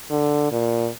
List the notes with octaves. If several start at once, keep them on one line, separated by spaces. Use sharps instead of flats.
D3
A#2